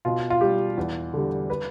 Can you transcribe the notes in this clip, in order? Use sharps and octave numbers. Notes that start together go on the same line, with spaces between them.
B2 F4
F4
G3 G4
E2
D3 G3
B4